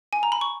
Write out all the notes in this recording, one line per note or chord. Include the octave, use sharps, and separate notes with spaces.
G#5
A#5
B5
C#6